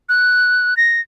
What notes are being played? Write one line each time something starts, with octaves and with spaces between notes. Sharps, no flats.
F#6
A#6